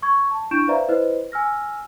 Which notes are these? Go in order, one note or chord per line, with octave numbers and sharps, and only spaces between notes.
C#6 G#6
A5
D4 E4 C#6 G6 D7 E7
B4 C5 D5 E5 F5 A#5
E4 B4 C5 D#5
G#5 E6 F6 A#6